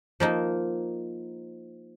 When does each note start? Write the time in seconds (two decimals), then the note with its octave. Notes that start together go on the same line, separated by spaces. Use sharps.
0.20 F3 A#3 D#4